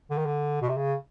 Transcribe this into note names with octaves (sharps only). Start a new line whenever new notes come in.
D3
D#3
D3
B2
C3
C#3